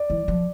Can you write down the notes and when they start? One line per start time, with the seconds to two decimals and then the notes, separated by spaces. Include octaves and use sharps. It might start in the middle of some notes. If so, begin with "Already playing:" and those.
Already playing: D5
0.10 E3
0.28 F3